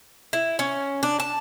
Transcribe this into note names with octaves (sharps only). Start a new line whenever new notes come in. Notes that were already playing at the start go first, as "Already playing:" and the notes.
E4
C#4
D4
A5